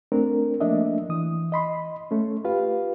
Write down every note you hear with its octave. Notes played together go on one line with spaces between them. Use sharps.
A3 C4 D4 A#4
F3 A3 A#3 D4 D#5 E5
E3 D#6
D#5 B5 C6
A3 C#4
F4 G4 B4 F5